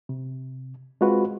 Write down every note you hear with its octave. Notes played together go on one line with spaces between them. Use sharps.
C3
G#3 C4 F4 F#4 B4